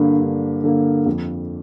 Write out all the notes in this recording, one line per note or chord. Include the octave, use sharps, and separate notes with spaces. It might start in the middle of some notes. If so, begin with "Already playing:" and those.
Already playing: G2 D3 A#3
G2
D3 A#3
F2